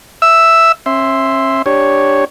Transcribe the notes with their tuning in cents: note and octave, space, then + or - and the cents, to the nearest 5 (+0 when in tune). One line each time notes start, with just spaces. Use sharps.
E5 +0 E6 +0
C#4 -40 E5 +0 C6 +0
D4 +0 G4 +0 C#5 +0